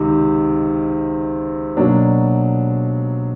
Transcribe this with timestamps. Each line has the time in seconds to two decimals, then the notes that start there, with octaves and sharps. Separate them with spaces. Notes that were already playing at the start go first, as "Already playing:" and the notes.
Already playing: C#2 C3 D#3
1.77 B2 F#3 A#3 D4